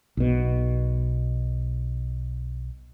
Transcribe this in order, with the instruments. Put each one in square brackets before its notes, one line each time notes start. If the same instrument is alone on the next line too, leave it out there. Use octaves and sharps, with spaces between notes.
[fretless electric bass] B1 B2